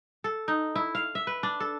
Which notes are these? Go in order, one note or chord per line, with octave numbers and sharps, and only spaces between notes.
A4
D#4
E4
F5
E5
B4
D4
A4